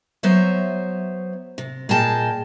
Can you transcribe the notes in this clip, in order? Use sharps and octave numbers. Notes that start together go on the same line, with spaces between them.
F#3 B3 C5 C#5 E5
C3
A#2 G#4 D#5 G5 A5